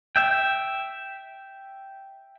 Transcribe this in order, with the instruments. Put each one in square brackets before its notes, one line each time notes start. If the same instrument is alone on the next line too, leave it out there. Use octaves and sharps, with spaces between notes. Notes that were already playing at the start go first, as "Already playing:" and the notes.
[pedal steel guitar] E5 G5